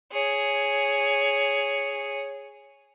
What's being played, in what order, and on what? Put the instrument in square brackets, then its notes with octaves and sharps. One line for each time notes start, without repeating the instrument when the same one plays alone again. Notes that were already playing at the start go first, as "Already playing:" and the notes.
[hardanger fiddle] G#4 C#5